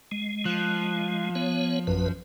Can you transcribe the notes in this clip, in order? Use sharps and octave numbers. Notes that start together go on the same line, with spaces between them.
G#3
F3 F#6
B3 C#5
A1 F#2 B4